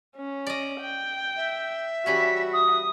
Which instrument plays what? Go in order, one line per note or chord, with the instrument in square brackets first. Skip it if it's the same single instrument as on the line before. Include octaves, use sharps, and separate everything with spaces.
[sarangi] C#4
[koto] D5 D#5
[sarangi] G5
[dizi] E5
[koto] E3 G3 C#4 [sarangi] F#4 [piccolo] B6
[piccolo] D#6